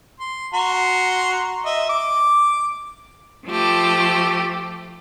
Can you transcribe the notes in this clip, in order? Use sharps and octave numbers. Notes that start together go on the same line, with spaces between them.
C6
F#4 A#5 C6
D#5 E5
D6
F3 A3 G4